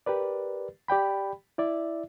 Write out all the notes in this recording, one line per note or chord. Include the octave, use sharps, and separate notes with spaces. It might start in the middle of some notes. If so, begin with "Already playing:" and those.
G4 A#4 B4 D5
G4 D5 G5 B5
E4 D5 E5